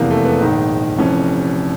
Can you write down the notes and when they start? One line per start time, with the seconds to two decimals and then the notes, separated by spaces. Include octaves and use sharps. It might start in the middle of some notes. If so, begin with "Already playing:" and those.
Already playing: F1 E2 C3 E3 A#3
0.10 A3
0.25 B3
0.41 A#1 G#2 D#3
0.98 F1 F2 C3 E3 C#4